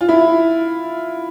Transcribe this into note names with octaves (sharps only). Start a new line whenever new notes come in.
F4
E4